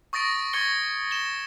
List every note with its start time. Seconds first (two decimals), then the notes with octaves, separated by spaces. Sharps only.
0.13 C#6 D#6 A6 A#6 D7
0.53 C#6 G#6 A6 C#7 G7
1.11 E7 G7